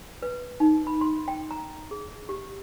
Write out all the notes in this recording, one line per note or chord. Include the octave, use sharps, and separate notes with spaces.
B4
D#4
B5
C6
G5
A#5
G#4
G4